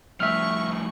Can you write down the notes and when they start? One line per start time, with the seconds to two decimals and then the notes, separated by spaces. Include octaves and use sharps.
0.20 F2 A2 E5 C#6 F6